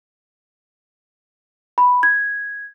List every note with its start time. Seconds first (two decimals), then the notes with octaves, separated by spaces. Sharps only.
1.78 B5
2.03 G#6